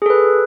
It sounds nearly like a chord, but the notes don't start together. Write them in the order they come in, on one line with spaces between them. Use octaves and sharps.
G#4 A4 B4